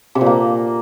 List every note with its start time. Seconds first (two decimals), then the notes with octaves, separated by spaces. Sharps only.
0.15 C3
0.21 A#2
0.26 A#3